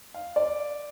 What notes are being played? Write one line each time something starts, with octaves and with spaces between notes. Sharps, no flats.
F5
D5